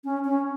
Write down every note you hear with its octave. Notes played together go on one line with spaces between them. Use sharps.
C#4
C#4